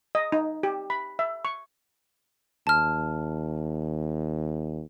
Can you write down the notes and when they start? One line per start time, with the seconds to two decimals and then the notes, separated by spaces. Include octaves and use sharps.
0.15 D#5
0.32 D#4
0.63 G4
0.90 B5
1.19 E5
1.45 C#6
2.67 D#2 A5 F6